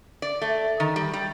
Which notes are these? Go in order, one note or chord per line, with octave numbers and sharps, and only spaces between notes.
D5
A3
D#3
G3
G3